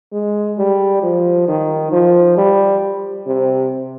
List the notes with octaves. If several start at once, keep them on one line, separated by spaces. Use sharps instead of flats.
G#3
G3
F3
D#3
F3
G3
C3